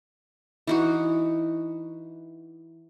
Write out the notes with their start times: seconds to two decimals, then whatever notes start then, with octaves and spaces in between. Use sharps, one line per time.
0.67 E3 D#4 F#4